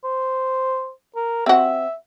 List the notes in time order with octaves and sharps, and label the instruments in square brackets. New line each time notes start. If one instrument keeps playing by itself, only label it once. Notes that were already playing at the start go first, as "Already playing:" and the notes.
[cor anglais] C5
A#4
[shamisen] C4 F#4 [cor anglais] E5